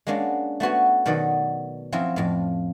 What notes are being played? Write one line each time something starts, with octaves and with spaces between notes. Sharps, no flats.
G#3 A#3 C#4 D4 F#4
A3 B3 F#4 C#5
B2 D#3 F#3 D5 F#5
F3 F#3 C4 C#4 E4
F2 A2